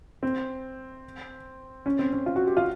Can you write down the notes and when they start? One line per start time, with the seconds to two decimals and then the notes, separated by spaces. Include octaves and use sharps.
0.23 C4
1.86 C#4
1.99 C4
2.12 C#4
2.26 F4
2.36 F#4
2.47 G4
2.57 F4